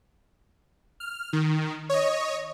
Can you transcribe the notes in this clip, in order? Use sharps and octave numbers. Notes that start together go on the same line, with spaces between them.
F6
D#3
C#5 D#5